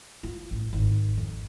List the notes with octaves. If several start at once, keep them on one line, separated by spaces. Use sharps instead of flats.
F4
A1
G#1
F2